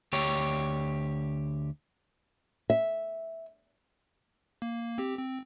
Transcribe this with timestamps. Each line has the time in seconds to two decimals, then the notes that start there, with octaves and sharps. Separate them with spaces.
0.13 D2 G4 C#5
2.70 E5
4.62 A#3
4.98 C4 G4
5.19 C4